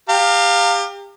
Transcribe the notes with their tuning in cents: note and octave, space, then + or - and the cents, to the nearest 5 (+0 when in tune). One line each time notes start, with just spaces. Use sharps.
G4 +30 F5 +10 A#5 -30